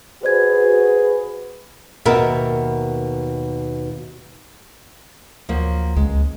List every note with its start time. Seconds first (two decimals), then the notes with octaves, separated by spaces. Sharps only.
0.23 F#4 G#4 B4 C5 D5 G#6
2.05 D#2 B2 B3 A#4 E5
5.49 D2 F3 F#3 A#3
5.96 C#2 G#3